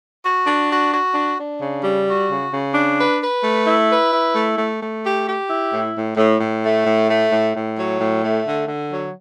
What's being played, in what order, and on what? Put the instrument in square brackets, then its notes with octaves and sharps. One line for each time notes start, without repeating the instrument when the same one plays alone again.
[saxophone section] F#4
D4
F#4
F#4
D4
D4
C#3
G3
F#4
C#3
C#3
D4
B4
B4
A3
E4
B4
E4
A3
A3
A3
G4
G4
E4
A2
A2
A2
A2
A3
A2
A3
A2
A2
F#3
A2
A3
D3
D3
F#3